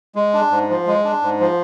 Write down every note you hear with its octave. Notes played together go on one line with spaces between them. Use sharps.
G#3
D4
G#2
F3
G#3
D4
G#2
F3